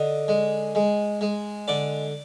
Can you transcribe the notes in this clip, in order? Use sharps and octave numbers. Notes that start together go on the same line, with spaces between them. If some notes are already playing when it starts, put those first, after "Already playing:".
Already playing: D3 D#5
G#3
G#3
G#3
D3 D5